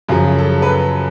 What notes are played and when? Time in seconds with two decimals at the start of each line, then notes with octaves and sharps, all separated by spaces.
0.08 F#2 C#3 F3 G#4
0.39 A4
0.62 B4
0.69 A4